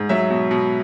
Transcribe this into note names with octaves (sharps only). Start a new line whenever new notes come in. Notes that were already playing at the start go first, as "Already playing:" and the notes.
Already playing: G#2
F#3 E5
B2
B2